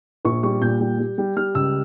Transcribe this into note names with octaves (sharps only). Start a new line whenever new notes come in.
A#1 C#6
G3 C#6
A#2 G6
G3
G3
G3
G3 F6
C#2 E6